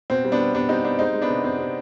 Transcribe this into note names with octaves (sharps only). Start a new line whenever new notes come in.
B2 C4
G3
B3 D4
G3
G3 B3 D4
G3 C4 D#4
G3 B3 D4
G#3 C4 D#4
G#3
B3 D4
C3
C3 C4
C3